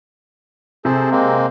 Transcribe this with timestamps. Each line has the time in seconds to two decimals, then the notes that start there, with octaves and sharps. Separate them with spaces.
0.85 C3 G#4 A4 C5
1.11 G#3 A#3 C4